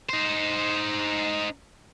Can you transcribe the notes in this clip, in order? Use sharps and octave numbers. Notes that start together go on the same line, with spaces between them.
D#4 C5